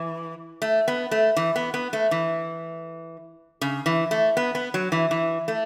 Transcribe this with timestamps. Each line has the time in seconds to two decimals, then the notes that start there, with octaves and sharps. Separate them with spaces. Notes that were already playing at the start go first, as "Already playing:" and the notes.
Already playing: E3
0.62 A3
0.88 B3
1.11 A3
1.36 E3
1.56 B3
1.74 B3
1.93 A3
2.11 E3
3.61 C#3
3.86 E3
4.11 A3
4.37 B3
4.55 B3
4.74 F#3
4.92 E3
5.11 E3
5.48 A3